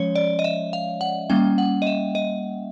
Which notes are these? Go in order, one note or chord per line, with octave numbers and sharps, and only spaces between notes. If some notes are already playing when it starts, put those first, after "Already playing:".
Already playing: F3 G#3 C#4 C#5
D5
D#5
E5
F5
F#5
G3 A#3 C#4 G5
F#5
D#5
E5
D#5